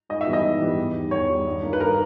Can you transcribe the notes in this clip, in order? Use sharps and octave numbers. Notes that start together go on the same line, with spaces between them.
G#2 D#5
E5
E3 G3 B3
D#5
G#2
E3 G3 B3
E2
D#3 G3
E2 C#5
D#3 G3
G2
D#3 A#3
B4
G2 A#4